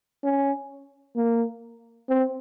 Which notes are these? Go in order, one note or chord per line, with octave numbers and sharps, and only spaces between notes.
C#4
A#3
C4